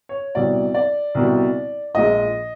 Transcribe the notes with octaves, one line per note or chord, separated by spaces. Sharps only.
C#5
C2 B2 G3 D5
D5
C2 B2 G3
A#1 G#2 F3 G#3 D#5